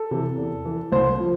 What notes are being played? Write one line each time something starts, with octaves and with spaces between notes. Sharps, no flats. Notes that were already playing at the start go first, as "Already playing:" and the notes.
Already playing: A4
C3 E3
E2
E3
C2 C5
F3